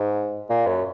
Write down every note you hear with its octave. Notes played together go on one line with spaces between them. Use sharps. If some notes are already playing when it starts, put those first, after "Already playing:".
Already playing: G#2
A#2
F#2